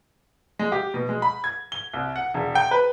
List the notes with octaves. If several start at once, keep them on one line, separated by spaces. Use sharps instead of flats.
G#3
G4
B2
G#3
B5
G#6
G7
C2
F#5
E1
G5
B4